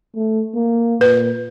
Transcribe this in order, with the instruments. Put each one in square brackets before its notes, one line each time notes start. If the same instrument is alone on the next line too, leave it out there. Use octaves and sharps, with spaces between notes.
[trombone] A3
A#3
[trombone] A#2 [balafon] B4